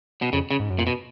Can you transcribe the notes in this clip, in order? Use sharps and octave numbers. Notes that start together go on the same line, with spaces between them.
B2
F2 C#3
C#3
G#2
F#2
F2 A#2
B2